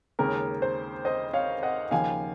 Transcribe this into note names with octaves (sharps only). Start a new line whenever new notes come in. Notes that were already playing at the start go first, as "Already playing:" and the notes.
D#2 C#3 G#3 C#4 A#4
C5
C5 D#5
C#5 F5
D#5 F#5
D#2 C#3 F3 F5 G#5